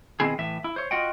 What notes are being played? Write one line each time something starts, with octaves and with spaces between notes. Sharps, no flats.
B2 D#3 C4 E4 G#4
A2 E3 E5
E4
C5 C#5
F4 F#4 D#5 F#5 G5